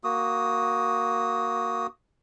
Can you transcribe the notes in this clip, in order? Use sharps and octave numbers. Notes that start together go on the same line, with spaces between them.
A#3 F#4 D#6